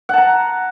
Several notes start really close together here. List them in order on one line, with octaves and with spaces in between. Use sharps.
F#5 A5 A#5